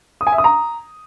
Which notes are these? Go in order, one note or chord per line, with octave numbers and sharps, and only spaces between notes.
D#6
G#5
E5
D#6
A#5